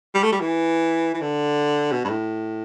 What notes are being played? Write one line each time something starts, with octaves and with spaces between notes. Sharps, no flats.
G3
A3
G3
E3
E3
D3
B2
G2
A2